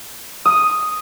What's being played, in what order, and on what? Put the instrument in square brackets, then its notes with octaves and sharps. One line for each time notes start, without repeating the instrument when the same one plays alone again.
[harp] D#6